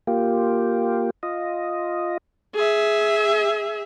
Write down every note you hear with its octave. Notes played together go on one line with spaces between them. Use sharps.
A#3 F4 G4
F4 D#5
G#4 E5